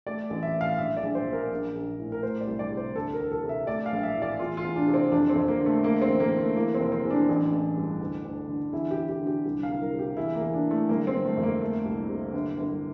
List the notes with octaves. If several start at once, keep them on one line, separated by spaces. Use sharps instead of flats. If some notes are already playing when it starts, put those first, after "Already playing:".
A3 D5
A1
E5
A2
F5
A#1 E5
D5
A#1
C5
A#2
A#4
A#1
A#1
A2
A#4
A3 C5
D5
C2
D5
C3
C5
D2 A4
A#4
D2
A4
C3
E5
A3 D5
F5
A#1
E5
A2
D5
E2 F4
F4
E2
D4
C3
C4
F2 D4
C4
F2
A#3
D3
A3
A3 A#3
C4
A1
A#3
A2
A3
E3 A#3
C4
F1
C4
E2
D4
A1
A1
G2
D2
D2
D3
E2 E4
G4
E2
G4
D3
G4
C2
F5
C2
A#4
C3
G4
E2 E4
A#3
E2
D4
E3
A3
G1 A#3
C4
G1
A3
F2
A#3
A3
C2
C3
G1
G1